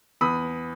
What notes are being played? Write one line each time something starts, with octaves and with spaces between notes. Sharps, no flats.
E2 B5 D#6